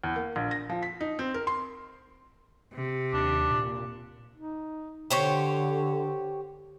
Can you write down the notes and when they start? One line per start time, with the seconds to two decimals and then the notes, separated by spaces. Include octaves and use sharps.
0.04 E2
0.16 A#3
0.36 A#1
0.51 A#6
0.69 F3
0.83 B6
1.01 D#4
1.19 C4
1.34 A#4
1.47 C6
2.73 C3
3.14 D#2 D4
3.51 A#2
4.36 D#4
5.10 D3 G4 C5 C#5